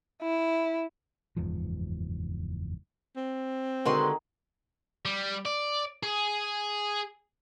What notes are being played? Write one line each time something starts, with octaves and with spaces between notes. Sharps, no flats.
E4
F#1 E2 G#2 F3
C4
D3 D#3 G#3 F#4 B4 C6
G3
D5
G#4